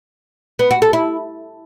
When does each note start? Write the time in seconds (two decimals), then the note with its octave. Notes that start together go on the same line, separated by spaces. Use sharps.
0.59 B3
0.71 F#4
0.82 A4
0.93 E4